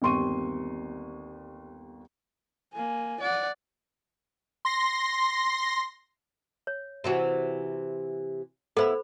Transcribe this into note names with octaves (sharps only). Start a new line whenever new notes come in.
G1 D#2 C4 C6 C#6 D#7
A#3 G#5
D5 F#5
C6 A#6
C#5
C3 E3 F#4
B3 E4 A4 C5 B5